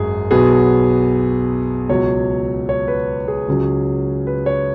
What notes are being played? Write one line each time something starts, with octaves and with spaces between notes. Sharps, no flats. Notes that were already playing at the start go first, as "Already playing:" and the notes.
Already playing: G#1 F#2 G#4
B1 B2 F#3 B3 G#4
C#2 B2 F#3 C#5
C#5
B4
G#4
C#2 C#3 F#3 C#4
B4
C#5